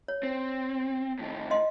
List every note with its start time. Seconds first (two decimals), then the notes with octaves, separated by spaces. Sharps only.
0.08 C#5
0.23 C4
1.19 A2 D#3
1.51 D#5 C6